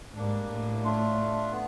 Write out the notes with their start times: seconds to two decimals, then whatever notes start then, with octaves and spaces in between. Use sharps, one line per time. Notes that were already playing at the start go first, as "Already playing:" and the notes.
0.16 G#2 G3 A#3 D4
0.50 A2
0.84 A3 D4 F4
1.52 B3